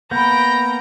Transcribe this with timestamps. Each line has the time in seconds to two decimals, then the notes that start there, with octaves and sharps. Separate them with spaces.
0.11 A#3 B3 G5 A#5 B5 G6